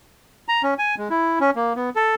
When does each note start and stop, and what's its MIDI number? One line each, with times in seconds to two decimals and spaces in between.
0.48 0.62 82
0.63 0.74 61
0.79 0.95 80
0.98 1.08 56
1.10 1.39 64
1.40 1.50 61
1.56 1.73 58
1.76 1.90 59
1.96 2.15 69